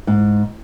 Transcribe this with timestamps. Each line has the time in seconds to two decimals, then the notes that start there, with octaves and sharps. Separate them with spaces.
0.07 G#2